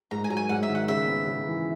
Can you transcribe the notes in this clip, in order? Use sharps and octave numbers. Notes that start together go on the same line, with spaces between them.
G#2 A#5
G#5
F#3 A#5
G#5
G#2 F#5
E5
D#3
F#5
C#3 E5
B3
C#3
E3